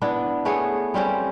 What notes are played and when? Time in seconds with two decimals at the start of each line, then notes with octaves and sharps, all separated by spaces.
0.02 B3 D4 E4
0.45 A3 B3 G#4 C#5
0.94 G3 C4 C#4 G4